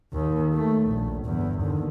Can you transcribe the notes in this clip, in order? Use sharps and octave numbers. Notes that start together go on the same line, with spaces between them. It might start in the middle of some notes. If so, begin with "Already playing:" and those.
D#2
A3
A#1
G1 E2
D#2 D3